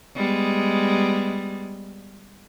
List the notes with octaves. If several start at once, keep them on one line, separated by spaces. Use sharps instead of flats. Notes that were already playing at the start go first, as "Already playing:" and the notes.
G3 G#3 B3